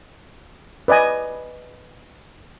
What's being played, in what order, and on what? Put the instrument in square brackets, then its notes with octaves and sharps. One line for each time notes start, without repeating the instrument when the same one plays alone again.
[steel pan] B4 D5 D#5 G#5